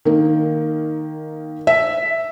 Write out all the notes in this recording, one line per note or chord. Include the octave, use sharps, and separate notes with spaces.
D#3 A#3
E5